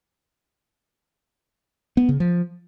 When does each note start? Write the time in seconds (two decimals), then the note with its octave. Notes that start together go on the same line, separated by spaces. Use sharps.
1.97 B3
2.09 C#3
2.20 F3